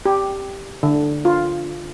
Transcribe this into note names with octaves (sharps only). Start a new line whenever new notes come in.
G4
D3
F4